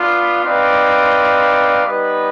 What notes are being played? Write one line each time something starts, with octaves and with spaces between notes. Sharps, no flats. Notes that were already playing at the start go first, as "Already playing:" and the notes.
Already playing: B3 D4 F4
C4 D#4 B4 D5 F5
G3 B3 D#4 B4 D#5